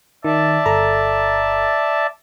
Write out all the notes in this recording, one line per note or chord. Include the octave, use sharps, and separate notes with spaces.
D#3 D5 E5 A5
G1 A4 A#5